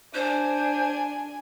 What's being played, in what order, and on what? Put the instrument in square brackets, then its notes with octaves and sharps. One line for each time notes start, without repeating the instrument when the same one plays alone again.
[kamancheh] D4 G#5 [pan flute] C5